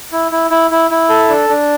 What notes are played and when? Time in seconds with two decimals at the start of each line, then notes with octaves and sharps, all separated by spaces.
0.12 E4
0.32 E4
0.51 E4
0.71 E4
0.91 E4
1.09 A4
1.29 D4
1.49 D4